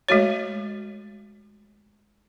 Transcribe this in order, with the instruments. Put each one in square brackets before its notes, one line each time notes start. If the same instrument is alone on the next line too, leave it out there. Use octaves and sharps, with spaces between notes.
[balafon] G#3 A3 F#4 C#5